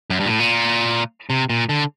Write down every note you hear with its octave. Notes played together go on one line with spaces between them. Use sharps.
F#2
G2
A#2
A2
A#2
C3
A#2
D3